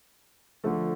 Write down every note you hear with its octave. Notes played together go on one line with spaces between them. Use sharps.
D3 F3 A3